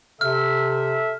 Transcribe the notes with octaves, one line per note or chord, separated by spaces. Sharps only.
C3 A4 E5 F6